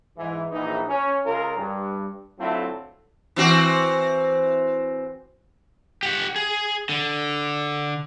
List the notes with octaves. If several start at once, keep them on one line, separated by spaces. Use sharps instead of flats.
G#2 E3
A#1 E3 D#4
C#4
C#2 C#3 F4 A#4
G2
D3 F#3 A3 C4 E4 F4
E3 C4 F#4
G4 F#5
G#4
D3